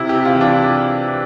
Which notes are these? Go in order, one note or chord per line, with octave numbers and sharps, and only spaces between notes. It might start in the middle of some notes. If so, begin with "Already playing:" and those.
Already playing: C3 E4
G4
C3
F4
E3
D4